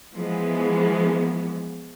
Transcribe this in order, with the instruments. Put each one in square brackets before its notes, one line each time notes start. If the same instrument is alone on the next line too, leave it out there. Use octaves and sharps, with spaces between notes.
[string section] E3 F3 G#3 B3